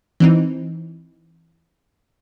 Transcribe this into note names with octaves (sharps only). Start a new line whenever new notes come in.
E3 C4 D#4